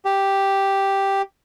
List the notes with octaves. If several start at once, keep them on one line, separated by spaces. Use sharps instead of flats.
G4